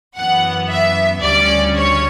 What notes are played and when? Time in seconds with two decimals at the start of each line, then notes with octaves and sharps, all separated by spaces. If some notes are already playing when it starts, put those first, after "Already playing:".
0.15 F#2 E3 B3 F#5
0.69 E5
1.22 D2 C#3 G3 C#4 D5
1.75 C#5